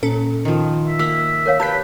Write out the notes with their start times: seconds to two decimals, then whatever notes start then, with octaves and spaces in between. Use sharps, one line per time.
0.03 A#2 C#4 A4
0.45 D#3 F3
0.87 E5
0.99 A#3 E6 B6
1.46 A#4 C#5 F5
1.60 G4 B4 A5 G6 B6